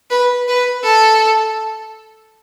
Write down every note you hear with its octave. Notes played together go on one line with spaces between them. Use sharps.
B4
B4
A4